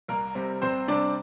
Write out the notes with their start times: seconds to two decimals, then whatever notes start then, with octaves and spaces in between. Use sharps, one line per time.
0.08 C2 A#3 A#4
0.35 C3 G3 C4
0.62 C2 C4 C5
0.88 C3 G3 C4 D4 D5